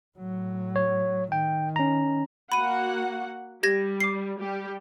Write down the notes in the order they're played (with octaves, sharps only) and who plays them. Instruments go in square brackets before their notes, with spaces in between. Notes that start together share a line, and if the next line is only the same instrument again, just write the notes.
[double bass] A2 F#3
[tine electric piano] C#5
[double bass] D#3 [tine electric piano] G5
[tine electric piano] C#4 A#5
[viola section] A#3 F#4 F#5 [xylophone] B5 D#7
[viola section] G3 [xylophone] G4 G#6 A#6
[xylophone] D6 C7
[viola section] G3 G4